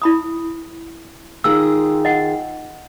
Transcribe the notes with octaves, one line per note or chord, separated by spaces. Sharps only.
E4 B5 D#6
D#3 F4 G#4 E6
D#5 F#5